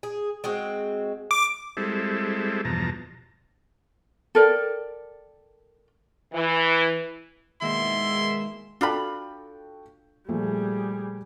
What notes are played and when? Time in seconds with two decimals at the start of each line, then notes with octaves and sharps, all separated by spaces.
0.03 G#4
0.44 G#3 C4 F#4
1.31 D6
1.77 G3 G#3 C4 E4 A4
2.65 E2 G2 B2 F3 A5 A#5
4.35 A4 A#4 D5 G5
6.33 E3
7.61 B2 D#3 G#3 A#3 E4 E5 C6
8.81 D4 F4 F#4 A4 G5 B5
10.29 A#2 F3 G3 A3 G#4